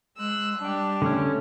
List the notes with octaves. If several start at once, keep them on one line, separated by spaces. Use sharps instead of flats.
G#3 E6 F#6
G3 D4 G4
D3 A3 C#4